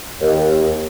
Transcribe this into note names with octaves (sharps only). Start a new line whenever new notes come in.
D#2